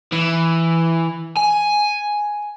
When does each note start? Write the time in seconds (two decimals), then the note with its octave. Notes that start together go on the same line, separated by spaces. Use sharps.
0.13 E3
1.36 G#5